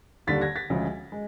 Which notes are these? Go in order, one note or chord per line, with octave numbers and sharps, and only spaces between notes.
D#2 D3 G3 A6 B6
G#6 A#6
A6 B6
D2 C#3 F3 G#3
G#3